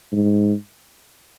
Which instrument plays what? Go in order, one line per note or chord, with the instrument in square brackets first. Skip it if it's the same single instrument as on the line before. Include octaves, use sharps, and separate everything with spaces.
[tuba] G#2